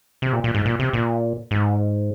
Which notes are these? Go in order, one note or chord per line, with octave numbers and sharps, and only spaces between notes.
C3
A#2
A#2
G#2
A#2
C3
A#2
G#2